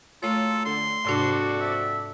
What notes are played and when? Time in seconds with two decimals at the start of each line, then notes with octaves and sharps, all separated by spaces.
0.23 A#2 F#3 A3 F4 A4 C#5
0.65 D3 C6
1.05 F2 G#2 C3 D4 F#4 A4 D5
1.60 E5